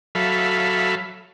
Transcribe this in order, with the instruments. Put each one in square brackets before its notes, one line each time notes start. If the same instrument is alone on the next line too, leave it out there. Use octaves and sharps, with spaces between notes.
[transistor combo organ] F#3 A4 E5 F5 B5